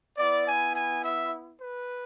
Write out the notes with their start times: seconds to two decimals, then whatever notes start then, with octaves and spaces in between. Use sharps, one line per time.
0.18 B3 E4 D5
0.47 G#5
0.75 G#5
1.04 E5
1.61 B4